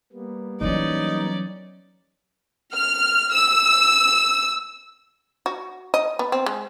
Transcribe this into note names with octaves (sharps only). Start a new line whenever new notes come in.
G3 A#3 B3
E3 F#3 C#4 D#4 D5
F6
E6
F#4
D#5
B3
C4
G#3